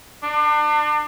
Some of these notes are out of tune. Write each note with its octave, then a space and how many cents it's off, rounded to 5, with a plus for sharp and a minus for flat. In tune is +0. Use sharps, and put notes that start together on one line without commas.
D4 +35